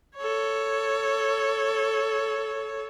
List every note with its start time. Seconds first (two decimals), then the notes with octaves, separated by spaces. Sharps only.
0.17 A4 C#5